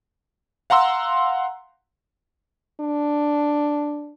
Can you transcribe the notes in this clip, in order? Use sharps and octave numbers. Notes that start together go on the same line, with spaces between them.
F5 F#5 A#5 C6 E6
D4